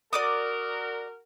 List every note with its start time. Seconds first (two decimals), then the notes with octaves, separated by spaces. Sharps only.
0.13 F#4 A#4 D5 D6 D#6